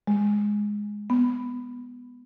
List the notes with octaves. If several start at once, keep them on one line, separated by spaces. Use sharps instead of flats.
G#3
B3